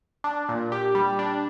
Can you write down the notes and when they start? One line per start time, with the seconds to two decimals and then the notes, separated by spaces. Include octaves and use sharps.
0.24 D4
0.49 A#2
0.72 G4
0.95 G3
1.19 D4